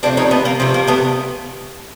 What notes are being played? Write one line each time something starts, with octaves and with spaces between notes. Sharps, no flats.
C3 F3 A3 C4 D4
C#4 D#4
A3 B3
A#3
C3 F3 A3
A#3
A3 B3